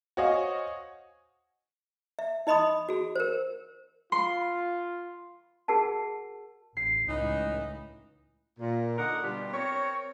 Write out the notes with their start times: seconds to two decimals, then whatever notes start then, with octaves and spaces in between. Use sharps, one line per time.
0.17 F#4 C5 C#5 D#5 F5 G#5
2.19 E5
2.47 D#4 D#5 B5 C6 D#6
2.89 F#4 G#4
3.16 A#4 C5
4.12 F4 C6
5.68 F#4 G#4 A#4 F#5 A5
6.77 A1 C7
7.08 C#2 A2 E3 D#4
8.59 A#2
8.98 D3 D#4 A#4 F#5
9.23 B2 G3 D4 F4 G4
9.53 C4 A#4 C#5